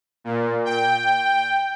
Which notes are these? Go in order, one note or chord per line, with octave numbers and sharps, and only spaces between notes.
A#2
G5